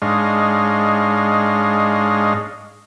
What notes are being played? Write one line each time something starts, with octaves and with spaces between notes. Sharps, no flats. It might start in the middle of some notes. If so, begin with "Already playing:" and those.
G#2 G#3 D4 C#5 D#5 F5